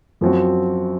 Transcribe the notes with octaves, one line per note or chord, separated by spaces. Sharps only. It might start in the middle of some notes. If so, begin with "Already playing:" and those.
F#2 F3 C4 F#4